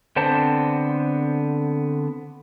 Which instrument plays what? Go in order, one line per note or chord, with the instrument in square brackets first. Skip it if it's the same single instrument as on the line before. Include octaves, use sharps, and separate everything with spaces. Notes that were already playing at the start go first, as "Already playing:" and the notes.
[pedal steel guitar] D3 B3 C4 C5 A5